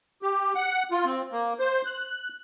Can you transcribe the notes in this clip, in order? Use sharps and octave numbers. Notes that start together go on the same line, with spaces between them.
G4
F#5
F4
C4
A#3
C5
F#6